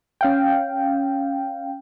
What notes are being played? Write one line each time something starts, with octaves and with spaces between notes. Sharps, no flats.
C#4 F5 G5